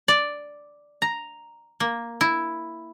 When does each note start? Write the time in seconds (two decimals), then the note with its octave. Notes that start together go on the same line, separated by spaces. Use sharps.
0.08 D5
1.02 A#5
1.80 A#3
2.21 E4